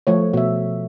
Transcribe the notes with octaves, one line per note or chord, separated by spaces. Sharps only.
F3 A3 C#5
B2 E5